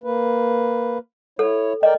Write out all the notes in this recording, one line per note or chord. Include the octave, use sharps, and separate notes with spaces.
A#3 B4
E4 A4 C#5
A#4 D5 D#5 G5